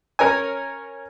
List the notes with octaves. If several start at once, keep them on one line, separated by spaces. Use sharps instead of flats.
C#4 A#4 C#5 G#5